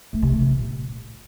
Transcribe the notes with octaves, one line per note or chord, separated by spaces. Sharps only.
A3
C3
A3
E3
A#2